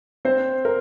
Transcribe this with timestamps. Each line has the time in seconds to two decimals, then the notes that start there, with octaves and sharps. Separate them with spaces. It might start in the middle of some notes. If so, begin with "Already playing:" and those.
0.25 C4 C5
0.65 A#4